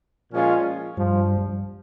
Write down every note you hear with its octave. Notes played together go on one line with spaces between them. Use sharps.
A#2 F3 G#3 C#4 F4
G2 F3 G3